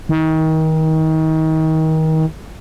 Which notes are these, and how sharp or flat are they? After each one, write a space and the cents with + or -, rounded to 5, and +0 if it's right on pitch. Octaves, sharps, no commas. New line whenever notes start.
D#3 +30